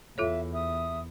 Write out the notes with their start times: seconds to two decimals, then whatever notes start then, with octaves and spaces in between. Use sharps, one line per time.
0.18 E2 F4 A4 C#5 E5 F5
0.52 E5 D#6